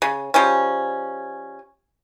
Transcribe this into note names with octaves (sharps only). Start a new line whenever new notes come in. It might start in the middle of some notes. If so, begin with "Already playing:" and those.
C#3
F3 G3 G#3 C#4